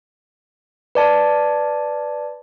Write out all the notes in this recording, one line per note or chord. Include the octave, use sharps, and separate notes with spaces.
B4 D5 A5